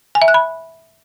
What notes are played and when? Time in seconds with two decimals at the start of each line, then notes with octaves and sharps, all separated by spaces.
0.15 G#5
0.22 E5
0.28 F#6
0.34 B5